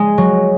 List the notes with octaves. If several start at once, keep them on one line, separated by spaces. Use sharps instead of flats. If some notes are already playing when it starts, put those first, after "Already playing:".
Already playing: G#3
F#3